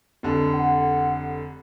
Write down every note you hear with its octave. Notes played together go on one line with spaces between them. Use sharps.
F1 D3
F#5